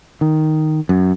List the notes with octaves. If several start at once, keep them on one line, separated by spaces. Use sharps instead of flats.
D#3
F#2